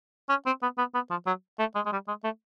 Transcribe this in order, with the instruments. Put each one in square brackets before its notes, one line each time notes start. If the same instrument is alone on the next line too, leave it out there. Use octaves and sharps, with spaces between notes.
[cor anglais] C#4
C4
B3
B3
B3
F3
F#3
A3
G#3
G#3
G3
G#3
A3